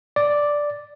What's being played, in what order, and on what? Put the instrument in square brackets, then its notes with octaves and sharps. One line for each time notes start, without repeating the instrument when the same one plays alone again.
[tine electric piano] D5